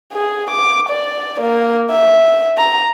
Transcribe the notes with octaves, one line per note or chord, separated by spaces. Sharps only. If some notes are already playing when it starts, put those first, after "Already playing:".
G#4
D6
D5
A#3
E5
A#5